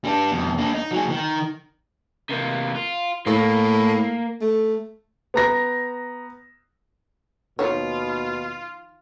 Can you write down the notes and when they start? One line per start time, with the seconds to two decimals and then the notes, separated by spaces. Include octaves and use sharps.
0.04 G3 D4
0.31 F2 B2
0.58 A#3 D4
0.74 D#4
0.91 F#3 G#4
1.10 D#3
2.30 C3 A#3
2.76 F4
3.27 A2 A#3
4.41 A3
5.34 B3 A#5 A#6
7.59 D#2 B2 D#3 F3 F4 C#5